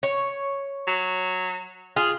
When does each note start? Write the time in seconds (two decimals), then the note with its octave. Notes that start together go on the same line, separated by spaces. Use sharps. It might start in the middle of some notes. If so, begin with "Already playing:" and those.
0.03 C#5
0.87 F#3
1.96 F4 G#4